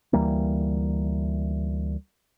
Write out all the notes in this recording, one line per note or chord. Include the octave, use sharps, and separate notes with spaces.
D2 E3 G3 A#3